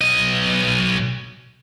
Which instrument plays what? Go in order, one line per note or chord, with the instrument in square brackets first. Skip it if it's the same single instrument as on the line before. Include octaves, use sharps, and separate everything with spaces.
[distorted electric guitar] B1 D#5